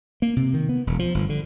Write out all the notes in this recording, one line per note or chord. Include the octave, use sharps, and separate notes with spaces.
A#3
C3
D#3
B3
E1
F3
G1
D3